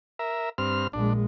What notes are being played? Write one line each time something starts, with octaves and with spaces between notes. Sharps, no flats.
A#4 E5
G2 C4 F6
A#1 G#3 D4